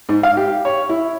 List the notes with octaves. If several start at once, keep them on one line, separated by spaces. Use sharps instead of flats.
G#2
F5
G4
C#5
E4